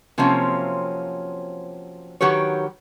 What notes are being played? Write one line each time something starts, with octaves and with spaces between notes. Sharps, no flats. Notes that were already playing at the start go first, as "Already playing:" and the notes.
C3 F3 F#3 A#3 C4 C#4
D#3 F#3 G4 B4 C#5